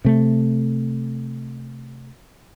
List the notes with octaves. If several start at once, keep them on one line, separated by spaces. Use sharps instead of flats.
C3 A3